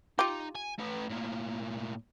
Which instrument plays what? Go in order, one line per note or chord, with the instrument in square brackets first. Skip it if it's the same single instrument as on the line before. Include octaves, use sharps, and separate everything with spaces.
[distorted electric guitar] D#4 [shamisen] F4 G4
[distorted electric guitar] G#5
A3 B4
A2 A#3